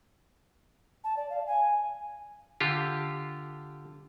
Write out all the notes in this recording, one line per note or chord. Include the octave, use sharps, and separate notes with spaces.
A5
D5
F5
G#5
D3 F4 G4